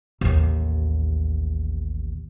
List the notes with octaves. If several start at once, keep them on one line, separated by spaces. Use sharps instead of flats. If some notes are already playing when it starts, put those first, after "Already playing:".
A1 D#2